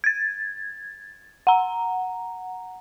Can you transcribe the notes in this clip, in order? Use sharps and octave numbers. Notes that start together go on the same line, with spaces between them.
G#6 A6
F#5 A#5